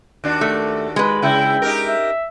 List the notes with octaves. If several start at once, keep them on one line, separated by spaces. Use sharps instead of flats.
D#2 D4 F#4
A3
G#3 B4
C#3 E4 G5
D#4 G4 A#4
E5